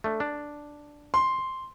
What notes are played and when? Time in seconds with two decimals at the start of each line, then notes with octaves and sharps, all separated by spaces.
0.04 A3 D4
0.20 D4
1.14 C6